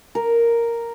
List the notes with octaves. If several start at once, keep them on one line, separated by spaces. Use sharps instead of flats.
A#4